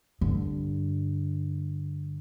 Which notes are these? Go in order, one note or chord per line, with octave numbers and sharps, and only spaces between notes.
G2 D3